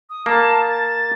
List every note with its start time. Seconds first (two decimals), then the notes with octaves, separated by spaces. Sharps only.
0.10 D#6
0.26 A#3 A5
0.69 A6